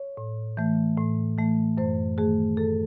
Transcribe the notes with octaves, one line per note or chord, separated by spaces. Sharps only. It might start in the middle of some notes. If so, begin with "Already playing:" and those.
Already playing: C#5
A2
E3 A3
A2
E3 A3
F#2 C5
D#3 A3 G#4
F#2 A4